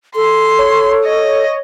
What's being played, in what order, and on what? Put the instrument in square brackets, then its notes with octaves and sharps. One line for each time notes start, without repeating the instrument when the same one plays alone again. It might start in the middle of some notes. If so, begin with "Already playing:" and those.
[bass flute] A4 [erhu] C6
[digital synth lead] C#5
[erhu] D#5